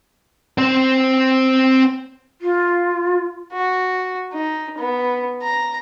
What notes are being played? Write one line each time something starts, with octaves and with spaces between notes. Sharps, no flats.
C4 C5
F4
F#4
D#4
B3
A#5